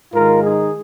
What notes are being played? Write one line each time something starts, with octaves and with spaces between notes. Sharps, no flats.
G#2 D#3 G#3 F4 A#4
D#4 G#4